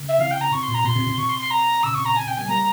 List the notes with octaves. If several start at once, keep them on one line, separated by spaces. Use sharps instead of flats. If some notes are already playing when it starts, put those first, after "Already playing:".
Already playing: C#3
E5
C3 E3 F5
G5
A#5
C3 C#6
C6
A#2
A#5
A#2 C6
C3
C3
C3 C#6
C6
C6
A#5
A#2 C#3 E6
C3 C#6
A#2 A#5
C3 G#5
C3 G5
G3 A#3 G#5
G3 A#3 A#5